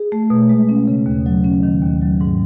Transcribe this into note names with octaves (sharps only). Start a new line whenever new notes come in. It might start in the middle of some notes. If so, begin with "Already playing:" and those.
Already playing: G#4
A3
B2
G#3
C#4
C#3
D#2
F#3
C#4
D#3
D#2
F#3
G#2